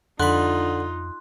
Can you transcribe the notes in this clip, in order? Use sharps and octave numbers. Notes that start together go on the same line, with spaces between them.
F2 D3 D#4 F4 B5 C6 F#6